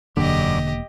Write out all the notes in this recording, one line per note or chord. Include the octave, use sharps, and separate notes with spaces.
E1 F#2 D3 A#3 G4 D5 D#5